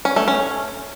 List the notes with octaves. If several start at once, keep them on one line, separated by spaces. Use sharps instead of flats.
C#4
A3
C#4